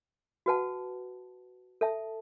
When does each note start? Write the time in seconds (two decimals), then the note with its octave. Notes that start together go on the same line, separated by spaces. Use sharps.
0.46 F#4 B4 F#5 A5
1.81 A4 E5 A5